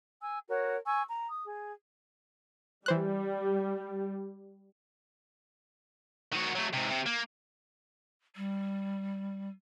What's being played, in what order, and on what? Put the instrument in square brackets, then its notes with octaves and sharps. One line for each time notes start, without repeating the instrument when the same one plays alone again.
[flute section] G#5 E6
F#4 A#4 C#5
G#5 C#6 E6
A#5
D#6
G#4
[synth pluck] E3 C5 F#6 [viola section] G3
[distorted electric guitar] D#3 F#4
F#3 A3
G#2 C3
C3
A#3
[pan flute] G3